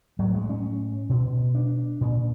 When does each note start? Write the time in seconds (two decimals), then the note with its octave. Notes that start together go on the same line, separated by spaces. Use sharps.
0.19 A2 F#3
0.35 G#3
0.49 C#4
1.09 B2
1.55 D4
2.01 A#2